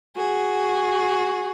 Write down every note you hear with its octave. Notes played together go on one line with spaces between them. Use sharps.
F#4 G#4